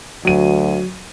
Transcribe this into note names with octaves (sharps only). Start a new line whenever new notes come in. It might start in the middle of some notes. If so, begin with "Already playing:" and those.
D2 F#3 D#7